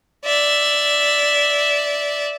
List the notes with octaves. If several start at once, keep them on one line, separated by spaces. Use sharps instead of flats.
D5 E5